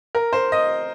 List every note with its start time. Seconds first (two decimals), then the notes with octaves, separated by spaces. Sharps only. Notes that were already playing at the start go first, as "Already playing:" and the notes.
0.15 A#4
0.33 C5
0.52 D#5